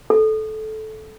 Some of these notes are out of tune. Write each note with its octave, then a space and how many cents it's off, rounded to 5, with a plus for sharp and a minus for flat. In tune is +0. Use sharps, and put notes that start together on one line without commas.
A4 -15